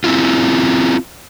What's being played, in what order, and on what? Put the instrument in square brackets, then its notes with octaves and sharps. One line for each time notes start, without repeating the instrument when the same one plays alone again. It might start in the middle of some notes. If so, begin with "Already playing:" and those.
[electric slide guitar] C4 E4 F4